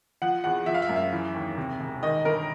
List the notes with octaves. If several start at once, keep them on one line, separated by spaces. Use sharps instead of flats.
F3 F#5
E2 F#5
F3 E5
F5
E5
F#2
E5
E3
D#2
C3
E1
D#3 D#5
G1 A#4